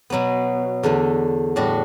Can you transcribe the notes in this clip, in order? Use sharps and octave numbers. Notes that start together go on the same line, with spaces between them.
B2 F#3 B3
E2 D3 A3
A2 G3 D4 F#4